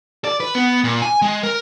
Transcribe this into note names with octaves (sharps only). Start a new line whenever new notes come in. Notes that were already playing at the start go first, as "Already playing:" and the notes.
D5
B4
B3
A#2
G#5
G#3
A#4